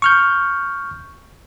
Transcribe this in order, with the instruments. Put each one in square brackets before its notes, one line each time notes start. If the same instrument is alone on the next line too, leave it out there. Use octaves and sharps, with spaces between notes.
[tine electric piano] C#6 F6 G6